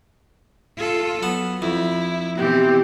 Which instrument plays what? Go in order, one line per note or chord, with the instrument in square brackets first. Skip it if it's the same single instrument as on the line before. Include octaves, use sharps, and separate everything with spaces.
[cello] F4 A4
[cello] F#3 [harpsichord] B3
[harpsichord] F2 [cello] E4
[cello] B2 E3 [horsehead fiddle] C4 G4